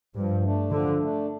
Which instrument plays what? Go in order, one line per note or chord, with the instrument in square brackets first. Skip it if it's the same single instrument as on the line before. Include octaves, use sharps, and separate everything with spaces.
[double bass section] G2 [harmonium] F3
[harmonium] A3 D4
[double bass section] D3 [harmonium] F3
[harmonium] A3
D4